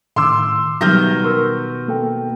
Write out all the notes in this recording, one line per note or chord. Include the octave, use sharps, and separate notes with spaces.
A2 D#3 C6 D6 E6
B2 D#3 F#3 G3 G4 F6 G6 A#6
A#4 C6 C#6 E6
A#3 A4 G5